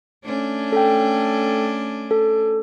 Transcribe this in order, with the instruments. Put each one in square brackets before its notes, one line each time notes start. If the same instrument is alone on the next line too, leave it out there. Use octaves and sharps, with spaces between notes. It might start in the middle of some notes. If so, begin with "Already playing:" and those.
[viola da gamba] A3 C#4 D4
[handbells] A4 G5
A4